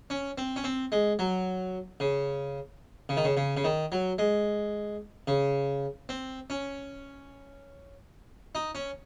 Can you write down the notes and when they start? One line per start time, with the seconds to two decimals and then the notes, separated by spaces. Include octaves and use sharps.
0.10 C#4
0.38 C4
0.56 C#4
0.64 C4
0.92 G#3
1.19 F#3
2.00 C#3
3.09 C#3
3.17 D#3
3.24 C#3
3.37 C#3
3.57 C#3
3.64 D#3
3.92 F#3
4.18 G#3
5.27 C#3
6.09 C4
6.50 C#4
8.55 D#4
8.75 C#4